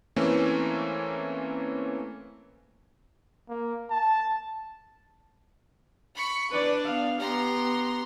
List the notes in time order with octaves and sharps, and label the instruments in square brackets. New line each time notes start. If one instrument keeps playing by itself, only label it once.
[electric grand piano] E3 A3 A#3 C4 C#4
[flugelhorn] A#3
A5
[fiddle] B5 C#6
[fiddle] D4 [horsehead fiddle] B4 D5
[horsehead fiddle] B3 F5
[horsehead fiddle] B3 G4 [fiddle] A#5 C6